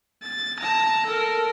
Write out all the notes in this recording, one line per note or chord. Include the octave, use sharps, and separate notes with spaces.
A6
A5 A#5
A4 A#4